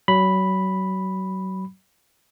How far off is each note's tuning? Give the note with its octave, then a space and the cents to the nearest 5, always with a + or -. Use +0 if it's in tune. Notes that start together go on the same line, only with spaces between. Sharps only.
F#3 +30 B5 +0